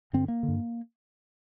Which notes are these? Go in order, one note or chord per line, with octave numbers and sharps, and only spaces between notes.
G2 D3 C4
A#3
D3
G2